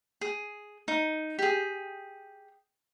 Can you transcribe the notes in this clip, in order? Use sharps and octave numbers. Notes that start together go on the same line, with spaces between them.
G#4
D#4
G4 G#4